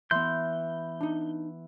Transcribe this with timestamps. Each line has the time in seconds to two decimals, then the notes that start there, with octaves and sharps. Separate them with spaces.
0.11 E3 B3 C6 G6
1.01 D4 D#4